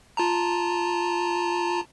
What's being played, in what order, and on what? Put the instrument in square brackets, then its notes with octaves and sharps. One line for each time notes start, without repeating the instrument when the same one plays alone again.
[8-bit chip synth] F4 A5 A#5